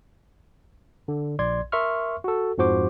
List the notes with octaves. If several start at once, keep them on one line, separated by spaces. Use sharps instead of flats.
D3
A#1 D5 C6 G#6
A#4 E5 C6 C#6 F6
F#4 A4
F2 G#2 F3 F#4 C5 D6